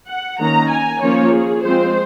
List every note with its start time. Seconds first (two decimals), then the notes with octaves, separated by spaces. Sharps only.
0.08 F#5
0.39 D#3 A#3 C#4 A#5
0.70 G#5
1.02 F3 A#3 C#4 C#5
1.33 G#4
1.64 F3 G#3 C4 C5